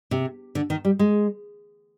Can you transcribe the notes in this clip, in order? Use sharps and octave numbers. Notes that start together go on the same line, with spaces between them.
C3
D3
D#3
G3
G#3